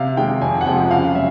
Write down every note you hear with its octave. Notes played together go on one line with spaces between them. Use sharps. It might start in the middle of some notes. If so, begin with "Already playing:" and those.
Already playing: C3 F5
D#3 G#3 G5
F2 G#5
F#5
C3 F3 G#3 G5
C#3 F5
F#3 E5